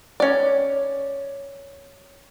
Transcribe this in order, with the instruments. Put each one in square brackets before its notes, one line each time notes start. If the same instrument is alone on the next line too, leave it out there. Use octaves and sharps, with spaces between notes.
[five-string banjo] C#4 D5